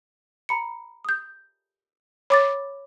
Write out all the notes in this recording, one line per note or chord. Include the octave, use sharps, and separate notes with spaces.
A#5 B5 C#7
D#6 G6
C#5 B5 D6 A6